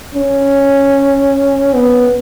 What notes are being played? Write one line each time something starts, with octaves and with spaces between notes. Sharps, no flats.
C#4
B3